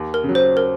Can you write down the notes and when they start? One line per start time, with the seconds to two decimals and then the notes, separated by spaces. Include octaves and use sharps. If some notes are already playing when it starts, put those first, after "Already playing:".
Already playing: D#2
0.14 A#4
0.24 C#3
0.29 F#3
0.35 C5
0.57 A#4